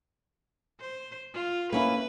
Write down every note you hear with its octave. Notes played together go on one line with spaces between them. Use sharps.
C5
F4
A#3 C#4 E4 B4